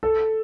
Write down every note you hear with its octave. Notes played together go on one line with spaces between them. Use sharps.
A4